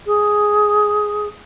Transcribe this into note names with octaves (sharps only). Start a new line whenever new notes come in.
G#4